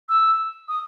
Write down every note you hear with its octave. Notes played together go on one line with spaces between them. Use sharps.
E6
D#6